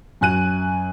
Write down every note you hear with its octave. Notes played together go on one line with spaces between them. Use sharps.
F#2 G#5 F#6 D#7